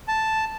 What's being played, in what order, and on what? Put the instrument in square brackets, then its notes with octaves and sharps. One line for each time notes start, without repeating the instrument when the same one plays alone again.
[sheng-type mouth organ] A5